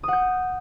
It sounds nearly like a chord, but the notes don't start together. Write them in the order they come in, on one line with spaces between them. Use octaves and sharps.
D#6 F#5 G6